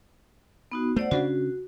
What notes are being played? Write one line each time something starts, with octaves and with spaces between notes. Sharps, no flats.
B3 D#4 F#4
A3 C5 D5 F#5
C#3 C#4 D4 F#4